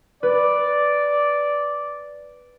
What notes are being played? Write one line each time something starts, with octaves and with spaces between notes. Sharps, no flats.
B4 D5